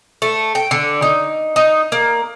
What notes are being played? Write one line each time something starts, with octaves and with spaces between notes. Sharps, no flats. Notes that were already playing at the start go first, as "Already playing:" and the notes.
A3
G5
D3
D#4
D#4
A#3